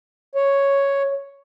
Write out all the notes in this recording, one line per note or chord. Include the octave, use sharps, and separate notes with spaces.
C#5